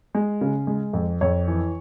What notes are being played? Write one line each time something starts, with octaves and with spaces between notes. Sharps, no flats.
G#3
C#3
G#3
F2
F2 C#5
E3